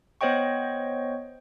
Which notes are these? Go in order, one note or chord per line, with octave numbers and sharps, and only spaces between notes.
B3 C5 C#5 D#5 G5 C#6